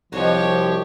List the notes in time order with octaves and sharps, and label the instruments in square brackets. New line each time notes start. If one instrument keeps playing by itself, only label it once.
[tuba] C2 [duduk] F3 [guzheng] D#4 F#4 [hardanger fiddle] G4 C#5